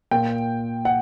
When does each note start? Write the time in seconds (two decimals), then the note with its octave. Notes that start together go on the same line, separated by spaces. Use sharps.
0.11 A#2 G5
0.85 F#5